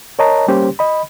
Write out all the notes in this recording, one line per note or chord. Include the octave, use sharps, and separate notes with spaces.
A#4 C#5 D#5 A5 A#5
G3 A#3 C#4 G4 C5
D#5 B5